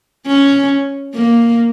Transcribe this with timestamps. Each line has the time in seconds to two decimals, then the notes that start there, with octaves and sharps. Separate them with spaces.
0.27 C#4
1.14 A#3